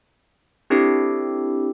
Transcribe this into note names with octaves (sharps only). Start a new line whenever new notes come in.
C4 D4 E4 G4 A4